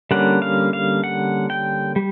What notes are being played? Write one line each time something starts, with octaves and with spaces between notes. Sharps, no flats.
D3 G3 A#3 C#4 F#5
F5
F5
F#5
G5
G3